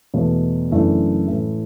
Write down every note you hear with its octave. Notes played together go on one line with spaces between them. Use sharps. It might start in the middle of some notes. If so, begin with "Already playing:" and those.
E2 B2 A3
F#1 F#2 E3 A3 D4
A2 E3 A3